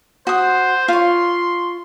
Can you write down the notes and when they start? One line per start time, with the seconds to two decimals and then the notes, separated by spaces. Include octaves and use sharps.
0.27 F#4 C5 D#6
0.88 F4 C#5 C6